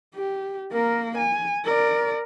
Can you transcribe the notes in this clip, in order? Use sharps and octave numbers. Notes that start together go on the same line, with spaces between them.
G4
A#3 A#4
G#5
A#4 D5